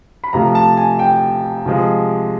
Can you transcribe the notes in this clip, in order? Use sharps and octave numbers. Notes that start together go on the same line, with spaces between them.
B5
C3 F3 A3 A#5
A5
G#5
G5
C3 F3 G#3